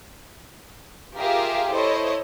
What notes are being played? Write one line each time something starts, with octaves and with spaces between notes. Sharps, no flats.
F4 G4 G#4 A#4 E5 F5
E4 A4 C5 C#5 D#5